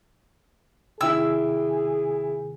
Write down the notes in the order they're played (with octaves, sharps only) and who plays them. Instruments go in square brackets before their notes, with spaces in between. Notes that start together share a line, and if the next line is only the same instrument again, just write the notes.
[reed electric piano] D#2 C3 D#3 [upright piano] E4 G5 [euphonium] G#4 [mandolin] E6